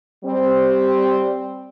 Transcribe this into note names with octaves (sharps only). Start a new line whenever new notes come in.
G3 C4